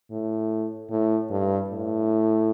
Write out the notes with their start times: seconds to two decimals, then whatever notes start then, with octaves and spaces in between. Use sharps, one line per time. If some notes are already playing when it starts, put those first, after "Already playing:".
0.11 A2
0.90 A2
1.30 G2
1.69 A2